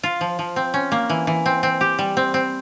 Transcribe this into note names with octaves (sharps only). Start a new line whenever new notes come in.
F4
F3
F3
C4
C#4
A#3
E3
E3
C4
C4
G4
G3
C4
C4